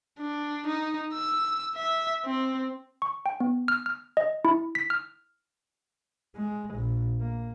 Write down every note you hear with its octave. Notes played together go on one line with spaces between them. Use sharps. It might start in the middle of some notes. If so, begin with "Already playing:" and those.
D4
D#4
E6
E5
C4
C#6
G5
B3
F6
F6
D#5
E4
B6
F6
G#3
A#1
A#3